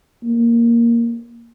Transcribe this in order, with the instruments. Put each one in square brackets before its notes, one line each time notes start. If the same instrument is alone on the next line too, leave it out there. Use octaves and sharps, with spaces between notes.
[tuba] A#3